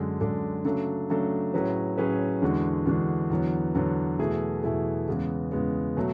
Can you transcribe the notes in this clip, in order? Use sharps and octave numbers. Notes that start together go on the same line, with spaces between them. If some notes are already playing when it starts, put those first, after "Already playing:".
Already playing: F#2 D3 G#3 D4 A4
F#2 D3 G#3 D4 A4
C#3 F#3 A3 D4 A4
C#3 F#3 A3 D4 A4
A2 F#3 C#4 G#4 B4
A2 F#3 C#4 G#4 B4
E2 D3 G#3 D4 F#4
E2 D3 G#3 D4 F#4
E2 D3 F#3 B3
E2 D3 F#3 B3
E2 B2 A3 E4 G#4
E2 B2 A3 E4 G#4
E2 C#3 G#3 B3
E2 C#3 G#3 B3
B2 F#3 A3